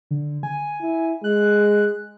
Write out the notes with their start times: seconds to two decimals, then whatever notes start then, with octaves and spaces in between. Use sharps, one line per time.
0.11 D3
0.43 G#5
0.82 E4
1.24 G#3 F#6